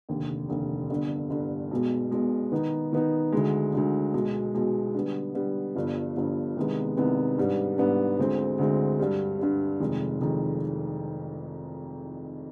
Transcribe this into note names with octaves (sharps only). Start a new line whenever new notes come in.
F1 D#2 D3
F1 D#2 D3
G1 G2 D3
G1 G2 D3
B1 B2 G#3
B1 B2 G#3
D#3 B3 D#4
D#3 B3 D#4
D2 D3 G#3
D2 D3 G#3
B1 B2 G#3
B1 B2 G#3
D3 G3 B3
D3 G3 B3
G1 G2 F3
G1 G2 F3
C2 C3 D#3 G#3 B3
C2 C3 D#3 G#3 B3
G#2 G3 B3 D4
G#2 G3 B3 D4
D2 D3 G#3 C4
D2 D3 G#3 C4
G2 D3 G3
G2 D3 G3
F1 F2 D#3 G#3
F1 F2 D#3 G#3